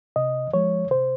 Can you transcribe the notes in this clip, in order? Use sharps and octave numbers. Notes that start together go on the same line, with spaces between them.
C3 D#5
F3 G#3 C#5
C3 C5